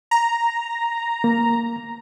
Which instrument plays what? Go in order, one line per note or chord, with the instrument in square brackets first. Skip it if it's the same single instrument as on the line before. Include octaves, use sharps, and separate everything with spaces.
[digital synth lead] A#5
[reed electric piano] A#3